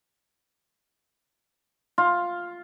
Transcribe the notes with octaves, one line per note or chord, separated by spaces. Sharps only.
F4